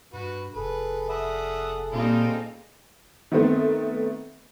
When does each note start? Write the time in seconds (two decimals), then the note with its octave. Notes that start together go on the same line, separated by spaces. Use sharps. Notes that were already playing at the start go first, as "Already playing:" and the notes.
0.13 G2 F#4 B4
0.55 F1 G#4 A4 B4
1.10 E5 F#5 D#6
1.92 A#2 G3 A#3 C4 D#4 F4
3.32 D#3 A3 B3 C4